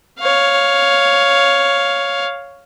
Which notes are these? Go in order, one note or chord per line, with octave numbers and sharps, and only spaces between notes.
C#5 F5